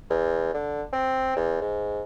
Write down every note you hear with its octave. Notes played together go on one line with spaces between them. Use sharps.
E2
D3
C4
E2
G#2